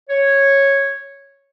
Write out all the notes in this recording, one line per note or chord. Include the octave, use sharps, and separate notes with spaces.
C#5